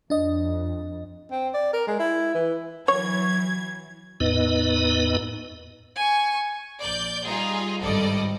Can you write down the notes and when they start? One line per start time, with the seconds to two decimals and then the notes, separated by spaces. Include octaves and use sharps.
0.10 F2 D4 D#5
1.32 C4
1.54 D5
1.73 A#4
1.87 G#3
1.99 E4
2.34 E3
2.88 E3 F#3 C#5 G#6
4.20 E2 A2 B3 D#4 B4 D#5
5.96 G#5 C#6
6.82 A#1 D5 G6
7.24 G3 D#4 F4 G#4
7.81 G#1 G2 G3 A4 D5 D#5